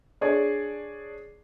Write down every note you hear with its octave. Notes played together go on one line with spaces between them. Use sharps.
D4 G#4 C#5 D5